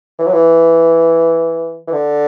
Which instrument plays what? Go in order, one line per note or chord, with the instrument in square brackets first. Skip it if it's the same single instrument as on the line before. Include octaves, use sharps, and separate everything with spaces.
[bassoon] E3
F#3
E3
E3
D3